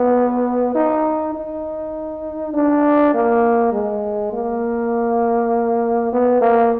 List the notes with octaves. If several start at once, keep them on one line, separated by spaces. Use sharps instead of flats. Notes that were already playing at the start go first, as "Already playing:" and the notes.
Already playing: B3
D#4
D#4
D4
A#3
G#3
A#3
B3
A#3